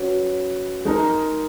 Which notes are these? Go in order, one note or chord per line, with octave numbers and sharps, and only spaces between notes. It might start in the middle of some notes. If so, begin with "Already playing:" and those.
Already playing: F#3 C#4 F#4 B4
G#3 D#4 A#4